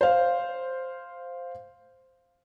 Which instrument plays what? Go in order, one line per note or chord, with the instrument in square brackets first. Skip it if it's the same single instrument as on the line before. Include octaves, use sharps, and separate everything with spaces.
[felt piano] C5 F5